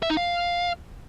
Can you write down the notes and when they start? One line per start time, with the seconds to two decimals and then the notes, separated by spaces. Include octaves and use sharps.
0.03 E5
0.10 D#4
0.17 F5